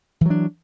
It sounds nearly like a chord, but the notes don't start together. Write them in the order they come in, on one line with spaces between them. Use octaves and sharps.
E3 F#3 D4